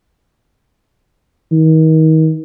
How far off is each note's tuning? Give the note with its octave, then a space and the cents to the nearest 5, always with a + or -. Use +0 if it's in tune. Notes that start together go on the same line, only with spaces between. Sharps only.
D#3 +35